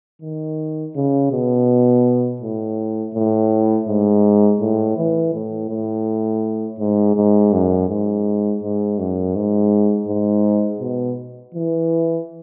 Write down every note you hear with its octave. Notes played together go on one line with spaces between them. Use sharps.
D#3
C#3
B2
A2
A2
G#2
A2
E3
A2
A2
G#2
G#2
F#2
G#2
G#2
F#2
G#2
G#2
B2
E3